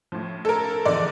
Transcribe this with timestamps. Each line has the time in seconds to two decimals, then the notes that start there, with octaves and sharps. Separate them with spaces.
0.12 A2 F3
0.45 A4
0.49 A#4
0.85 E2 D3 F3 D5